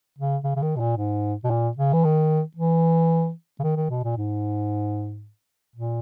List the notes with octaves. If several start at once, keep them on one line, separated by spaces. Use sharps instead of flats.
C#3
C#3
C#3
D#3
B2
A#2
G#2
B2
A#2
C#3
E3
D#3
E3
C#3
D#3
D#3
B2
A#2
G#2
A#2